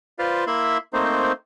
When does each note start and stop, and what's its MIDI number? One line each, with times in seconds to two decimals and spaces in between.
0.19 0.44 65
0.19 0.44 71
0.19 0.44 72
0.19 0.44 74
0.19 0.44 77
0.47 0.78 58
0.47 0.78 64
0.47 0.78 76
0.47 0.78 83
0.47 0.78 84
0.93 1.32 57
0.93 1.32 58
0.93 1.32 60
0.93 1.32 63
0.93 1.32 72